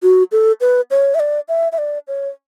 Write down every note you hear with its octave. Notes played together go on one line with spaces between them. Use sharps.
F#4
A4
B4
C#5
E5
D5
E5
E5
D5
C#5